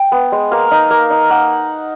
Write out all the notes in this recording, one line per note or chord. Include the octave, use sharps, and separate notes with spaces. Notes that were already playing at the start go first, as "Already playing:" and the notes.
Already playing: G5
B3
G#3
A#3 F5
D#4
A#3
D#4
A#3 F#5